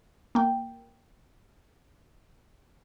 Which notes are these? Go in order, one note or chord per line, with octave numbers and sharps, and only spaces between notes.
A#3 G5